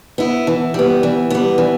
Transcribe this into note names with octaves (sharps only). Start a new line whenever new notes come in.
B3 E4
E3
G3 B3
E3
G3 B3
E3